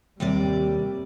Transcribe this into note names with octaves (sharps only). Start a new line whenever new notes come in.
D#2 C3 G3 D5